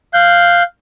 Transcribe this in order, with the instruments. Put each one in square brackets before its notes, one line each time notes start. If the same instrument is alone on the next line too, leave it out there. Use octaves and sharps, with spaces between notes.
[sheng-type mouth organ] F5 F#6 G6